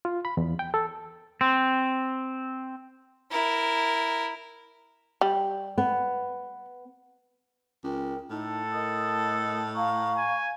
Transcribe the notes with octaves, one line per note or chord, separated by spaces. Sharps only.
F4
B5
E2
G5
A4
C4
E4 A#4
G3
B3
C#2 A#4 G5
A2 D#4 A4
A#4 D#5 D#6
F5 A#5 C#6
G#5